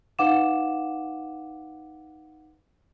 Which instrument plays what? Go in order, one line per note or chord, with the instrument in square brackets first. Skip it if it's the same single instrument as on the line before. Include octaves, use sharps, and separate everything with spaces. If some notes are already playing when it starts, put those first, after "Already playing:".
[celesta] D#4 B4 F5 F#5 D6 E7